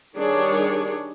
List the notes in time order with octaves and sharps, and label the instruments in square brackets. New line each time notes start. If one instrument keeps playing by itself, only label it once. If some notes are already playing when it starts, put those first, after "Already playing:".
[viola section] D#3 G3 D4 G#4 C#5